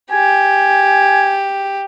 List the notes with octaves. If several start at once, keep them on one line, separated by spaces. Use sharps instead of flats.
G4 G#5